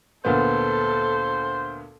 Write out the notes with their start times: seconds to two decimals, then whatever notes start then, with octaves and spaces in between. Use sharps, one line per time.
0.25 D2 A#2 B3 A4 C5